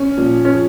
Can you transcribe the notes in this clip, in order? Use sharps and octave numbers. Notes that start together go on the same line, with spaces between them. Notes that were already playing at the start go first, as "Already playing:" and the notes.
Already playing: C#4
A#2 F3
C#4
F3